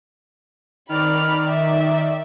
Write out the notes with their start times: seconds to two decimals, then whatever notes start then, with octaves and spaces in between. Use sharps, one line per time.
0.89 D#3 D5 B5 F6
1.47 E5